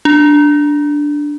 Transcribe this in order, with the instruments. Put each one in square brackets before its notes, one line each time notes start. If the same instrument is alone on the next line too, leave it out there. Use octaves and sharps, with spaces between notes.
[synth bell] D4